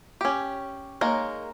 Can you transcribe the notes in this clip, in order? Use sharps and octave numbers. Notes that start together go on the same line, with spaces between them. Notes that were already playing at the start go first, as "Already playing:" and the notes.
C#4 G4
G#3 A#3 D#4 A#4 C#5